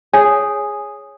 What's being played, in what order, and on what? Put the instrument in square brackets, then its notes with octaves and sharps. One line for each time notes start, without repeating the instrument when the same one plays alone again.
[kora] G#4 [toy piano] C#5 G#5